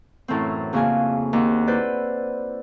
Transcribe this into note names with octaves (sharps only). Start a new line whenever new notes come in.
F#2 A2 E3 C4
F2 C#3 A#3 F#4 G#5
D#2 F#5
E4 B4 C5 D5